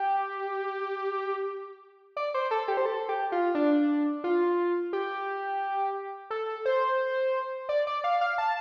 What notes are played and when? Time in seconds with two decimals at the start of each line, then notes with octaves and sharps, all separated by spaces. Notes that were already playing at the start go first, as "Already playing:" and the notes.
Already playing: G4
2.17 D5
2.34 C5
2.51 A4
2.68 G4
2.77 C5
2.86 A4
3.09 G4
3.32 F4
3.55 D4
4.24 F4
4.93 G4
6.30 A4
6.65 C5
7.69 D5
7.87 D5
8.04 F5
8.21 F5
8.38 A5